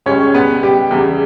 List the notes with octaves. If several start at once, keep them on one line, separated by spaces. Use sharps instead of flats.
C#2 C#3 G3 C#4 C#5
B3 B4
G3 G4
E2 C#3 G3